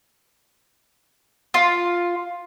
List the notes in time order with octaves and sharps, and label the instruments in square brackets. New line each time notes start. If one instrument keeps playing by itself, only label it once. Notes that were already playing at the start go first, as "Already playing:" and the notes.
[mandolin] F4